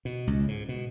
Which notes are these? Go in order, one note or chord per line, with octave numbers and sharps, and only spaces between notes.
B2
C#2
G#2
B2